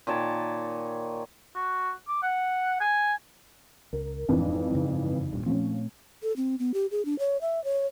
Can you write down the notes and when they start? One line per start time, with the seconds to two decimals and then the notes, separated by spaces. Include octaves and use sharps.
0.07 A#2 D#3 C#5 A5
1.55 F#4
2.08 D6
2.23 F#5
2.80 G#5
3.93 C#2 A#4
4.28 D#1 G#1 F2 E3 C4 D4
4.70 F#2 C#3
5.32 D#1 G2 A#2
5.46 A#2 F3 A3 C4 C#4
6.23 A4
6.36 C4
6.59 B3
6.74 G4
6.91 G#4
7.05 D4
7.19 C#5
7.41 E5
7.64 C#5